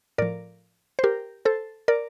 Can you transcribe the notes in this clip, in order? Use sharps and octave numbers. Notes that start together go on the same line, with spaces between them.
A2 F3 A#4 D5
C5
G4 A#4
A4 C5
A#4 D5